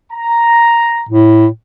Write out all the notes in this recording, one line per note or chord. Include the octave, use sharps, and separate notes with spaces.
A#5
A2